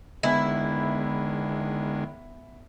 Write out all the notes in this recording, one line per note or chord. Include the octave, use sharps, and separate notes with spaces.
E2 D3 D#3 G#3 B3 E4 E5 G#5